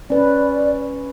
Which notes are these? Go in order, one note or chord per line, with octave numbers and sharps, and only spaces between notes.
C#4 B4 D5